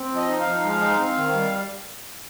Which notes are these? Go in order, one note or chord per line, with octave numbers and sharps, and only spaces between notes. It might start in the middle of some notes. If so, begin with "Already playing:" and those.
Already playing: C4
F3
D#5
D#4
F5
F3
G#3
D#4
C4
D#3
G3